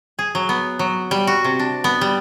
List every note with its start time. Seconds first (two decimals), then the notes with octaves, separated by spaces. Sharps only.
0.19 G#4
0.35 F#3
0.49 B3
0.79 F#3
1.11 G3
1.27 F#4
1.44 C3
1.59 D4
1.84 B3
2.01 G3